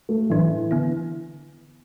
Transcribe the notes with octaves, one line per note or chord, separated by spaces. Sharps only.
A3
A2 E3 F#3 D4
D3 B3 E4